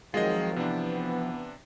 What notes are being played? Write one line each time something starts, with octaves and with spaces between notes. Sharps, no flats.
D#3 F3 F#3 G#3 C4 F4 G#4 D#5
C3 E3 B3 D4